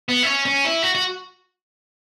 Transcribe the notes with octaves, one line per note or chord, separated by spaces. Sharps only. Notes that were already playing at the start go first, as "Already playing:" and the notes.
B3
E4
C#4
C#4
E4
F#4
F#4